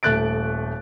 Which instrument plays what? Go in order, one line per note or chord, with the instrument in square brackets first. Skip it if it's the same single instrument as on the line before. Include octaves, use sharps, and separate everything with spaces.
[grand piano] D#1 A3 F#6 A6 D7